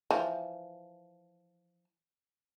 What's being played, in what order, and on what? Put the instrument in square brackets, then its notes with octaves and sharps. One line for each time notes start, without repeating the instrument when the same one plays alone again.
[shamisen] E3 F3